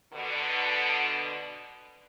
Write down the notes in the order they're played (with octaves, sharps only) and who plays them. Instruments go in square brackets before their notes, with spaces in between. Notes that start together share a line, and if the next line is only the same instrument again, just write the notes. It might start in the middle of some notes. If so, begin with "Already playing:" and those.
[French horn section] B2 D3